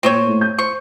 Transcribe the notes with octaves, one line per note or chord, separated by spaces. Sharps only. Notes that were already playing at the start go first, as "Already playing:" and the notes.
A#2 C4 C5 C#5 D#7
A2
G6
C5 C#6